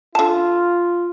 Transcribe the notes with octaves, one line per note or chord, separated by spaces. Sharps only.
D3 F4 A5